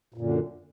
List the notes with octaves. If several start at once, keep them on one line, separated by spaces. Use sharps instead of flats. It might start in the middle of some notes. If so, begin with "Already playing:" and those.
F#2 A#2 D3